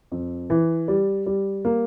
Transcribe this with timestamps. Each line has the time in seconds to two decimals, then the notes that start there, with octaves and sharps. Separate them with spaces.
0.12 F2
0.50 E3
0.88 G3
1.26 G3
1.65 A#3